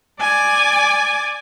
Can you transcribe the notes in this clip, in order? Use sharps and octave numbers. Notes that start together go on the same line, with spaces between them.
D5 G#5